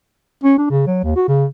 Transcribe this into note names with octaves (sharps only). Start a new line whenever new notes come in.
C#4
D4
C#3
F#3
D#2
F#4
C#3